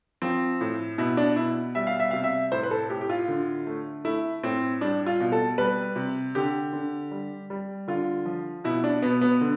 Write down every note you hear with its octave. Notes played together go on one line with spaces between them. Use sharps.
F3 C4
A2
B2 E4
D4
B2 E4
G3 E5
F5
E5
C3 F5
E5
A2 C5
B4
A4
A2 G4
G4
F4
D3
A3
A3 E4
A2 C4
G3 D4
F4
B2
A4
G3 B4
C3
D3 G4
D3
G3
G3
D3 F4
F3
B2 E4
D4
B2 B3
B3
D3